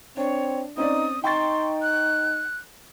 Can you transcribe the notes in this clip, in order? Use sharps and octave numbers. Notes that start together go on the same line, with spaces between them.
C4 D4 C#5
C4 C#4 D#4 D5 D#6
D#4 G5 C6 C#6 A6
F#6